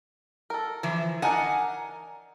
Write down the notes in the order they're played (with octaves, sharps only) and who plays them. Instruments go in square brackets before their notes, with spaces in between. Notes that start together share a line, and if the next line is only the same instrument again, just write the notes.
[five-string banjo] A4 A#4
[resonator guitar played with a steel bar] E3 F3
[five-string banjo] D4 D#4 A#4 [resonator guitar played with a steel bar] F#5 G#5